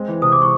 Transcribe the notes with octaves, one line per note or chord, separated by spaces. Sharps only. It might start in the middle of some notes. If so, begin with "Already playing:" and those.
Already playing: G#3 C4
E3
C3 D#6
D6
E3
C#6